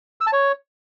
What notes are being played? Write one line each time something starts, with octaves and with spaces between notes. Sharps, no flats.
E6
A5
C#5